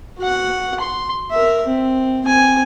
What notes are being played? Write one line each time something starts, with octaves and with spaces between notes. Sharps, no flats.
F#4 F#5
C6
A#4 E5
C4
C4 G#5